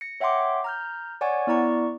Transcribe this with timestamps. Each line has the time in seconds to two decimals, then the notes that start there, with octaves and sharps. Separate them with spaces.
0.01 A#6 C#7
0.20 C#5 E5 F#5 G5 C6 D6
0.64 A#5 F6 G6
1.21 C#5 D5 F#5 G#5 C#6
1.47 B3 E4 D5 A#5 C#6